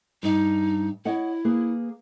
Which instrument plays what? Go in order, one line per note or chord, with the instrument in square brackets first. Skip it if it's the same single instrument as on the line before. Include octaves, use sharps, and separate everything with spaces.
[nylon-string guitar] G2 D#5 [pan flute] D#4
[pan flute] E4 [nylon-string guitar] C#5 D#5 F#5
[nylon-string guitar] A#3 G#4 B4